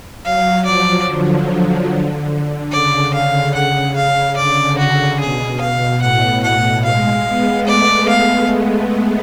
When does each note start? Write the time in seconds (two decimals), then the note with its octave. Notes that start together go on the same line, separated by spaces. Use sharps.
0.24 F#3 F5
0.65 F3 D5
1.06 D3
2.72 C#3 D5
3.14 F5
3.55 F#5
3.96 F5
4.36 D3 D5
4.78 F#4
5.20 B2 G#4
5.61 F5
6.02 A2 F#5
6.43 B2 F#5
6.85 G#3 F5
7.26 B3
7.67 A3 D5
8.08 G#3 F5